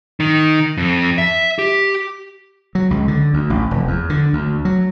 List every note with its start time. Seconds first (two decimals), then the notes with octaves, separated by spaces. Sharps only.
0.20 D#3
0.77 F2
1.18 E5
1.59 G4
2.75 F#3
2.91 C#2
3.08 D3
3.34 D2
3.50 A1
3.71 F1
3.87 E2
4.10 D3
4.33 D2
4.65 F#3